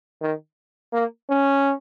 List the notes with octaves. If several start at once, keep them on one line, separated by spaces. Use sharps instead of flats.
D#3
A#3
C#4